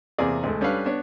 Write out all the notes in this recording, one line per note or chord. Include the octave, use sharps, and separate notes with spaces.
E2 C3 A#3 G#4 D5
D2 G#3 A3
G3 C#4 D4 A4 B4 F5
B3 D4 C#5